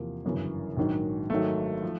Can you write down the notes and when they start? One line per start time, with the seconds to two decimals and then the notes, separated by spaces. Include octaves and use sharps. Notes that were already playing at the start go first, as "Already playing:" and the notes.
Already playing: E2 C3 F3 A#3
0.25 G1 F#2 C#3 E3
0.77 A#1 G#2 D#3 F#3
1.30 G#1 G#2 D#3 F#3 A3
1.82 F3